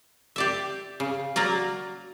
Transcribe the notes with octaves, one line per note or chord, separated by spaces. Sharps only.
G4 D5 E5
C#3
F#3 A#3 A#4 D5